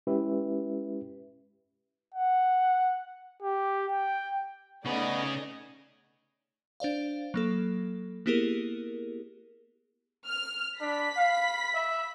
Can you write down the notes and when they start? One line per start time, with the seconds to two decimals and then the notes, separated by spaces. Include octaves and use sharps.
0.07 G#3 C#4 E4 G4 B4 E5
2.14 F#5
3.42 G4
3.92 G5
4.86 C#3 A3 B3 C#4 D#4 G#4 D5 D#5
6.80 D4 C5 D5 F5
7.34 F#3 A#3 A4
8.26 A#3 B3 E4 G4 G#4 A#4
10.26 F6
10.81 D4 B5 B6
11.17 F5
11.75 E5